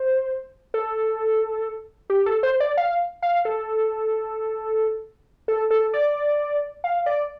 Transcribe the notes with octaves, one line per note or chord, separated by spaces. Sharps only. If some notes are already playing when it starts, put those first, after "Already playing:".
Already playing: C5
A4
G4
A4
C5
D5
F5
F5
A4
A4
A4
D5
F5
D5